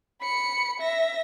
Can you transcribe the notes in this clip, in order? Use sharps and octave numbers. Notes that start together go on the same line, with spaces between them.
B5 C#7
E5 A#6